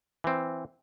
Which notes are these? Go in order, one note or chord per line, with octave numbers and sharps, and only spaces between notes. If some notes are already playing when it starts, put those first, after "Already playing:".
E3 C4